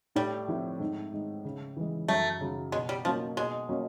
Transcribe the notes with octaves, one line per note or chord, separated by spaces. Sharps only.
A2 G3
F3 A3 C4 E4
G#2
D#3 G#3
C#3
E3 G#3
F#2 A3
C#3 F#3
B2 G#3
G3
F3 F#3 A#3 C#4
B2 G#3
F#3 A#3 C#4